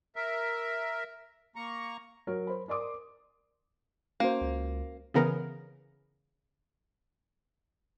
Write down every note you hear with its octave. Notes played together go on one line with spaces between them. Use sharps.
A#4 E5
A#3 A#5 C#6
F#3 A#4 C#5
C5 B5
A#4 D5 C6 D6 D#6
A#3 C#4 F#4 C5
C#2
C#3 E3 B3 A#4